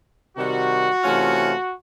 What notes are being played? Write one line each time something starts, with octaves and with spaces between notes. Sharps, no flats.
C3 D#3 G3 F#4
C3 E3 A3 C#4 F4